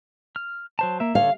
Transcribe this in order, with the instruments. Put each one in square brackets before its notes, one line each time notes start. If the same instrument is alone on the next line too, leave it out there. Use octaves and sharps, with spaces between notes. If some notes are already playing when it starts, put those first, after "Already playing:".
[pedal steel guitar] F6
F#3 C5 A5
A#3 E5
[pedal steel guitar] D3 A4 C#5 [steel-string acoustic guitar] F5